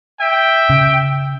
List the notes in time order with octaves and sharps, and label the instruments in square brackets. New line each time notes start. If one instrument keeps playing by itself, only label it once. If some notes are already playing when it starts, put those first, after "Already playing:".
[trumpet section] E5 G5
[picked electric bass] C#3